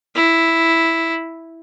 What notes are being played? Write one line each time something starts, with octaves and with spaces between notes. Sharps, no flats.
E4